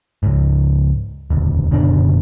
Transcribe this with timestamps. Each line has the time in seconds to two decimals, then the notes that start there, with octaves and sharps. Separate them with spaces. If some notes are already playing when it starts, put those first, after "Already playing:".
0.23 C#2 G#2
1.30 E1 D2
1.71 F#1 B2 D3 D4